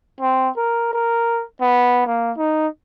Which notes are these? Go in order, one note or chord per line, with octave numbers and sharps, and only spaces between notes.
C4
A#4
A#4
B3
A#3
D#4